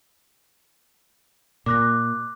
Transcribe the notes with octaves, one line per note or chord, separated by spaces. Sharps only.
A#2 D6 F#6 A#6